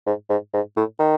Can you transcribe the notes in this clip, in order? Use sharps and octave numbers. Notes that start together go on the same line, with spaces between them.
G#2
G#2
G#2
A2
D#3